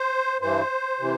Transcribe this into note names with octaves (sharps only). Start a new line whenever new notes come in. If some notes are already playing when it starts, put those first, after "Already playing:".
Already playing: C5
G2 E3 C5
C3 E3